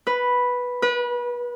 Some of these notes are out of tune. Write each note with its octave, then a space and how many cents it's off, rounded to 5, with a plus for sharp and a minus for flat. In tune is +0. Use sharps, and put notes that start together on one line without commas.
B4 -5
B4 -30